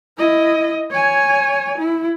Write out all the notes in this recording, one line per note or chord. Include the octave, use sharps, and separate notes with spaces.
E4 D#5
C#5 G#5
E4